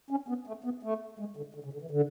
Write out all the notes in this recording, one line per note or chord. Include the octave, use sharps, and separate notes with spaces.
C#4
B3
A3
B3
A3
G#3
D3
D3
C#3
D3
E3
D3